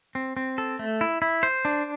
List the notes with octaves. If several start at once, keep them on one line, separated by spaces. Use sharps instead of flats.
C4
C4
A4
A3
E4
E4
C5
D4